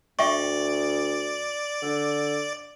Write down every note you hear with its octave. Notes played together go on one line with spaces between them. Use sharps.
D2 D5 E5 G5 C#6
D3